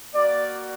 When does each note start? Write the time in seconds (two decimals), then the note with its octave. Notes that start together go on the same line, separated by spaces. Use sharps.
0.14 A#3 F#4 D5